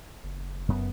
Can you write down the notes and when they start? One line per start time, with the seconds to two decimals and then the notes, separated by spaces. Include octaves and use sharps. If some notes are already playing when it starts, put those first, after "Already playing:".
0.24 F#1
0.68 F#2 B3